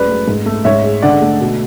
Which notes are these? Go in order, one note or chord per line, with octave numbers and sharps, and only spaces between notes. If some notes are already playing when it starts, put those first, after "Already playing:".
Already playing: F#2 G#3 B4 D5
A3
G#2
A3
G#2 C#5 E5
G#3
D3 D5 F#5
A3
B2